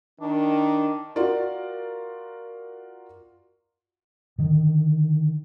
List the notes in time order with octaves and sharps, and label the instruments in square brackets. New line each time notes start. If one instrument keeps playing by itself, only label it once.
[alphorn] D#3 [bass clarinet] D4
[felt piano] F4 F#4 A#4 D5
[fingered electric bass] D3 D#3